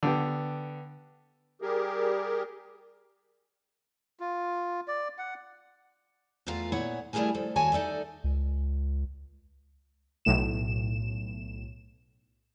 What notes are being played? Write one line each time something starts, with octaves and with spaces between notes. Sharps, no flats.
D3 B3 G4
G3 G4 G#4 A#4
F4
D5
F#5
E2 A3 B3 F4 F5 A#5
A#2 B3 E4 C#5 F#5
G3 A3 E4 G#4 A#4 G#5
F3 A4
D#2 F#4 C#5 G#5 A5
D#4 A4 D5 E5
C#2
B1 A2 E7